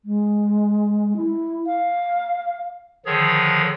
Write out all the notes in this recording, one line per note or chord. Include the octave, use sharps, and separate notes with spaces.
G#3
E4
F5
D3 D#3 F3 G#4 C#5